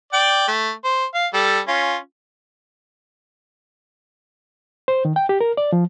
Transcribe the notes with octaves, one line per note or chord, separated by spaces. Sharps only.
D5 G5
A3
C5
F5
G3 A4
C#4 F4
C5
D#3
G5
G4
A#4
D5
F3